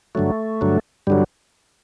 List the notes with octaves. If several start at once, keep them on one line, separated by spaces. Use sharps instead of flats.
G2 D3 F#3 A3
G2 D3 F#3
G2 D3 F#3 G3